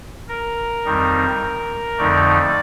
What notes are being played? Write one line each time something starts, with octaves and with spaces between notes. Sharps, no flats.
A#4
F2 D#3 G3 C4 D#4
F2 D3 F3 A3 D#4 D5